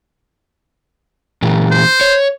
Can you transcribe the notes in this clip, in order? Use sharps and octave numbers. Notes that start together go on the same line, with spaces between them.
A#2 E3
C5
C#5